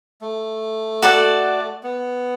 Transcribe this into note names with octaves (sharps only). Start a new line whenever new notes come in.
A3
F#4 A4 D5 F#5
B3